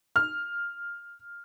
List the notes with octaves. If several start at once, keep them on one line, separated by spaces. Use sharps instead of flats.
F6